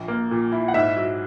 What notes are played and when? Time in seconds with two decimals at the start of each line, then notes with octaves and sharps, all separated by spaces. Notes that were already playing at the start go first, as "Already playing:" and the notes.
Already playing: A#1
0.08 A#3
0.31 A#2
0.52 E4
0.68 F#5
0.74 G#2 E5
0.97 F#3